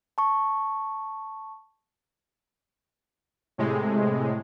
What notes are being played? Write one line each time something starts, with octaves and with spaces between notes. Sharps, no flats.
A5 C#6
A2 C3 G#3